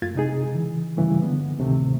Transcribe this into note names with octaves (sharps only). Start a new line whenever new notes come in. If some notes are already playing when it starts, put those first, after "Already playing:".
F#2 A3 F4 G#6 A6
C3 G#3 D#4 G#4
C#3 E3
G2 C#3 E3 G3 A3
D3 F3 G#3 B3
D2 A2 C3 D#3 A3